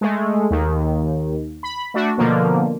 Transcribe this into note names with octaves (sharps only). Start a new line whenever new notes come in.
G#3 A3
D#2 D#3
B5
A3 D4 F#4
B2 D3 F3 A#3